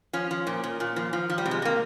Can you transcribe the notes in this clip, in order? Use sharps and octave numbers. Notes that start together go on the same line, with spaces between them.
F3 C#4
F3
A#2
A#2
A#2
F3
F3
F3
G3
C3
G#3
C3 A#3